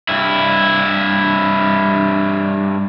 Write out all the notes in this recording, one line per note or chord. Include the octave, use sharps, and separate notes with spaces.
G2 E4